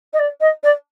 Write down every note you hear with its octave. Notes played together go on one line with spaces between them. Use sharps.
D#5
D5
D#5
D5